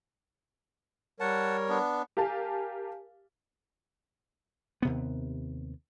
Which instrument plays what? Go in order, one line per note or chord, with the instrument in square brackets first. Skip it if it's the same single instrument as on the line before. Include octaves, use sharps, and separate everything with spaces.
[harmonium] G3 A#4 C#5 [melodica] F#5 A5
[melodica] B3 D4
[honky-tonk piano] G4 A#4 F5 G#5 A5
[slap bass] D#2 C3 B3